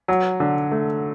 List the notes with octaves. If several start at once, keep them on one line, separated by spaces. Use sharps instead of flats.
F#3
D3
A3